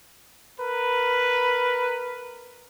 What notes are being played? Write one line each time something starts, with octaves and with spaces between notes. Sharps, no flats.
A#4 B4